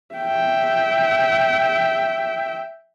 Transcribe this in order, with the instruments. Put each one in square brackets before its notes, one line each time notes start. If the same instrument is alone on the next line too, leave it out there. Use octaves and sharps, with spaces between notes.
[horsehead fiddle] E5 G5